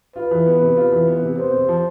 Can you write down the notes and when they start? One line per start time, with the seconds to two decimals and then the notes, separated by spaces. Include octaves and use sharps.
0.16 F4 B4
0.31 E3
0.46 B3
0.62 C3
0.77 F4
0.92 E3
1.07 B3
1.23 C3
1.38 B3 C5
1.54 C3
1.69 F3